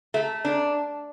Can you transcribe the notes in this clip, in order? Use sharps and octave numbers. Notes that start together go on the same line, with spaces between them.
A3
D4